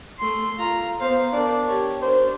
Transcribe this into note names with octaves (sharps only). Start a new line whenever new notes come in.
A3 C6
F4 A#5
B3 C5 F5
D4 A#4 D5
G4 C#5
D4 A#4 C5